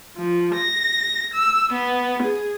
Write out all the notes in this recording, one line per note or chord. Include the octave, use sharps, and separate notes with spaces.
F3
A#6
E6
B3
G#4